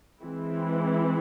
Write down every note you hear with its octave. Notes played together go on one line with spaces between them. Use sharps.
E3 G#3 C4 E4